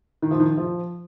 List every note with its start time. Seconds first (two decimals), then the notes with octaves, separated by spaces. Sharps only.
0.22 D#3
0.31 F3
0.40 D#3
0.57 F3